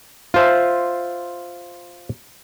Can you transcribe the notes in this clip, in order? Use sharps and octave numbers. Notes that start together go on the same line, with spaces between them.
F4 C5 E5